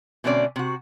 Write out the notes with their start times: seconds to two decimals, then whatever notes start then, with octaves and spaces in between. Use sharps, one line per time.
0.24 B2 D3 A3 C4 C#4 D5
0.56 C3 F#4